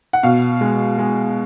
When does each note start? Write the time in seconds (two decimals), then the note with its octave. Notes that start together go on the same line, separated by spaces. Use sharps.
0.13 F#5
0.23 B2 F5
0.61 G#3
0.98 G#3